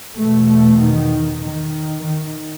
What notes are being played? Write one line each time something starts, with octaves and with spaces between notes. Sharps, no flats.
E2 B2 A3
A3
D#3
D#3
D#3